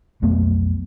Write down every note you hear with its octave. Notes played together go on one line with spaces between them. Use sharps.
B1 F2 A3 B3